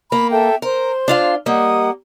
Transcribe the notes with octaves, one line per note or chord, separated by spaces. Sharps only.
A#3 B5
A4 E5 G5
A#4 C5
D4 F4 F5
G3 A#3 D#5 F#5 D#6